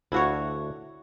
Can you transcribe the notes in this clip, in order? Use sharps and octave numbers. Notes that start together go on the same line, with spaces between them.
D2 D4 E4 F#4 C#5 F5